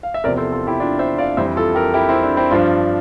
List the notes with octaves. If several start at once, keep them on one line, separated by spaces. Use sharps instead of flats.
F5
E5
E2 C3 F3 A#4 D5
A4 C5
F4 A4
E4 G4
D4 F4
C5 E5
D5 F5
F2 E3 G3 C5 E5
F4 A4
G4 A#4
E4 G4
C4 E4
D4
C4 E4
G2 F3 D4 F4